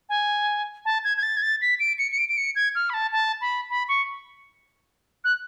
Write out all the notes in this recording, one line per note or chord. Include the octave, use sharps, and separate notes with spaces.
G#5
A5
G#6
G#6
A6
G#6
A6
B6
D7
C#7
C#7
D7
D7
C#7
G#6
F6
B5
A5
A5
B5
B5
C#6
F#6